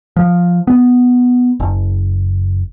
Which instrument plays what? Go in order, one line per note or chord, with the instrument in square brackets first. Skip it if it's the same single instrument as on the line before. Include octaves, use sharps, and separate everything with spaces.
[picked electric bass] F3
B3
F#1